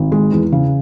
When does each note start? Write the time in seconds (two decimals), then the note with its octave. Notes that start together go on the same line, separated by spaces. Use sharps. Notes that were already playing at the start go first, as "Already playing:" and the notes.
Already playing: G#1
0.12 G#3
0.32 E2
0.52 C#3